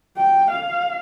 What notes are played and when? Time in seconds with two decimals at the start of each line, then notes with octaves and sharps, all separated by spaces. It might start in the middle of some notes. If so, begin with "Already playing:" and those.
0.17 G5
0.51 F5